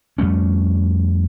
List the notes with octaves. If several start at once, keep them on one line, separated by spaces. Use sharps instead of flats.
F2 G3 A3 C#4